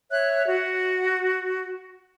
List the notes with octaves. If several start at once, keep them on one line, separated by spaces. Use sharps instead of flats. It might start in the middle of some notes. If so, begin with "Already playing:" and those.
C#5 E5 F#6
F#4